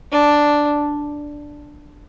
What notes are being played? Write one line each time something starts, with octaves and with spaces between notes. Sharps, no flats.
D4